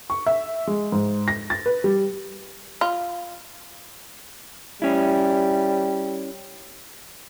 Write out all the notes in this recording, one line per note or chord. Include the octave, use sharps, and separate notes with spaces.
C#6
E5
G#3
G#2
A#6
A6
B4
G3
F4
G3 C#4 E4